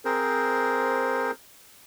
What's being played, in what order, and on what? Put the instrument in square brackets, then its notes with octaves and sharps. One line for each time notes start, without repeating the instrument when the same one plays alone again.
[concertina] C4 G#4 A#4 C5